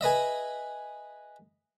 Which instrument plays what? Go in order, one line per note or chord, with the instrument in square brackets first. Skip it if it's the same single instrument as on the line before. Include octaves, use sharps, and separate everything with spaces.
[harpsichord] G#4 B4 D#5 E5